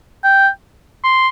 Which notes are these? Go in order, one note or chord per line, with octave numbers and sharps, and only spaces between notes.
G5
C6